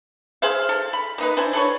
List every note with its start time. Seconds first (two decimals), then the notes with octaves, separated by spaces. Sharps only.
0.42 G#4 C5 E5 F5
0.69 A4
0.93 B5
1.18 A#3 D#4 B4
1.37 D4 E4 C5 G#5
1.53 D4 A4 B4 C#5